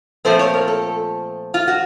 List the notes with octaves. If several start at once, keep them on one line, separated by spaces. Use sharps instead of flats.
A#2 F3 A3 C4 C5
C#5
A#4
A4
F4
F#4